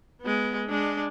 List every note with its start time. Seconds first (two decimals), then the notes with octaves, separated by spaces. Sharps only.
0.21 G#3 B3
0.68 G#3 D4